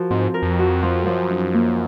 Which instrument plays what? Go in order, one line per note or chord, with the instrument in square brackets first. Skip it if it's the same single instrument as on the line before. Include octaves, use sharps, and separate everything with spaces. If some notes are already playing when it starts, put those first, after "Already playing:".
Already playing: [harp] F3 F#4 A#4
[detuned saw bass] G#2 [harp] C4
[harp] A#4
[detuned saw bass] F2
[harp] F#4
F3
[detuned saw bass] F#2 [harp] F3
[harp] D#4
A#3